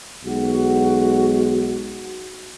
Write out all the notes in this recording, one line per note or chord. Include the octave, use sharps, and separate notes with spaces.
B1 G#3 F#4